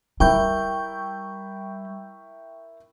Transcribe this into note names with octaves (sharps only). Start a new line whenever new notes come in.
G3 E4 A#4 E5 G5 C#6 G6